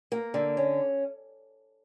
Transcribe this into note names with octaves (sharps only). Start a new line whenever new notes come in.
A#3
D3
C#4